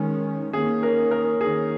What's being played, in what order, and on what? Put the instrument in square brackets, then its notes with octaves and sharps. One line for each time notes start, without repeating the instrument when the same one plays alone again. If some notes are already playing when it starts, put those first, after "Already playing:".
Already playing: [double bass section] D#3 G#3 C#4
[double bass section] D#3 A#3 C#4 [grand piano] G#4
[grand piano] A#4
A#4
[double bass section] D#3 A#3 C#4 [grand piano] G#4